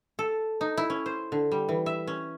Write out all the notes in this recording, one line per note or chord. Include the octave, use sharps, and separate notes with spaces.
A4
D#4
E4
C#4
C5
D3
G3
E3
E5
C#4